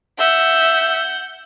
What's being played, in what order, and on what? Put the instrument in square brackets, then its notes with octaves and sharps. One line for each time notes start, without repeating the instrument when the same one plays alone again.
[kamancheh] E5 [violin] F#5 G6